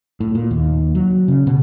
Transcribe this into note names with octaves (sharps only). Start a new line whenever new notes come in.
A2
A#2
D#2
F#3
C#3
B2